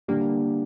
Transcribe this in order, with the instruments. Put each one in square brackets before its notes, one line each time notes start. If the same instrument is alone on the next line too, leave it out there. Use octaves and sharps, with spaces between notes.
[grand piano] D3 G3 D4 G4 [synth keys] A#3